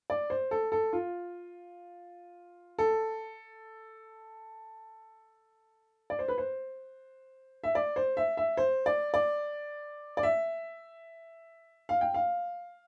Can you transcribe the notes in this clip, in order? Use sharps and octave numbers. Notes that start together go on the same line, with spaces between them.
D5
C5
A4
A4
F4
A4
D5
C5
B4
C5
E5
D5
C5
E5
E5
C5
D5
D5
D5
E5
F5
G5
F5